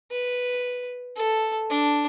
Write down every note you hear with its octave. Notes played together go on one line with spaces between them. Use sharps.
B4
A4
D4